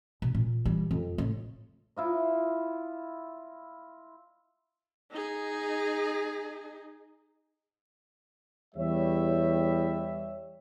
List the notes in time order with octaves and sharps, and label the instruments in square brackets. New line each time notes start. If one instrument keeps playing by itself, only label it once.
[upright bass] B2
A#2
E3 G3
F2
A2 C#3
[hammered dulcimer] E4 F4 D#5
[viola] D#4 G#4
[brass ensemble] E2 G3 C#5 E5